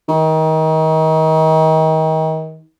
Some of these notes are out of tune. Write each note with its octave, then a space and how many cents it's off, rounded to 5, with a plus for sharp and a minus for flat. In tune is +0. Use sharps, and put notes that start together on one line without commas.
D#3 +30